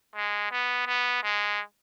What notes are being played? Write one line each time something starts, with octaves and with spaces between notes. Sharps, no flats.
G#3
B3
B3
G#3